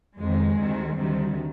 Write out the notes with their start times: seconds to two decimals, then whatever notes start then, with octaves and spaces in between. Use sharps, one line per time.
0.19 F2 D#3 G#3
0.56 D2 C3 D#3
0.95 D2 C3 D#3 G3